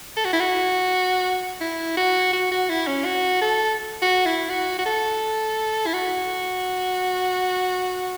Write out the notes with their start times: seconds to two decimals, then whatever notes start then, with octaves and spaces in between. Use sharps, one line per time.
0.16 A4
0.25 F#4
0.33 E4
0.40 F#4
1.61 E4
1.97 F#4
2.33 F#4
2.52 F#4
2.70 E4
2.87 C#4
3.05 F#4
3.41 A4
4.02 F#4
4.26 E4
4.50 F#4
4.78 F#4
4.86 A4
5.86 E4
5.94 F#4